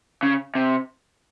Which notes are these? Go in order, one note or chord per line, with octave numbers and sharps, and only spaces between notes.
C#3
C3